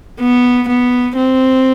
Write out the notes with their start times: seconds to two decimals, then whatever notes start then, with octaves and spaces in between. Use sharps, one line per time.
0.20 B3
0.69 B3
1.17 C4